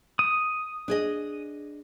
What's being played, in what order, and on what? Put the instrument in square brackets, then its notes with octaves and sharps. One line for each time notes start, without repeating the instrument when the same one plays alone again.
[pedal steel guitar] D#6
[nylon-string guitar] D4 G#4 D#5